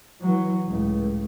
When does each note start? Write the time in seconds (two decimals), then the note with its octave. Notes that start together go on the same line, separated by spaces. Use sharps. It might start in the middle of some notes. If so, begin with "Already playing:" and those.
0.21 E3 F#3
0.67 C#2 A2